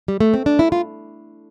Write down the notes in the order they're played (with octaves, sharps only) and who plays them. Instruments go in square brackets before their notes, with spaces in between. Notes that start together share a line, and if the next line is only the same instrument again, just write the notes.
[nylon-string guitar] G3
A3
C4
D4
E4
F4